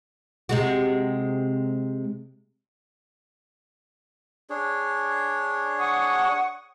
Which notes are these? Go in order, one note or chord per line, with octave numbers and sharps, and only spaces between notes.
C3 G#3 F#4
D4 G#4 C#5
F#5 C#6 D#6